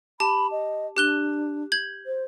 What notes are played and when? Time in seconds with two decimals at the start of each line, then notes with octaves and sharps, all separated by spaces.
0.20 G4 A5 B5
0.51 D#5
0.97 D4 G4 F#6 G7
1.72 G6 G#6 F#7
2.06 C5